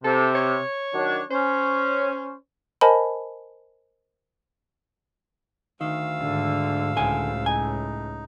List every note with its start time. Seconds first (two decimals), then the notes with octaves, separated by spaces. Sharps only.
0.04 C3 A4
0.35 C#5
0.94 D#3 F#3 D4
1.31 C#4 C5
2.81 A#4 C5 D#5 G#5 A5 B5
5.81 D2 D#3 F5 E6
6.21 G#2 D3
6.97 C#2 A2 D3 G#5
7.46 D#4 G#5